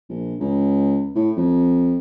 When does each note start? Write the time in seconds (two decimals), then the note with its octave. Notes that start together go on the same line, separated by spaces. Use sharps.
0.09 A#1
0.40 C#2
1.15 A2
1.37 F2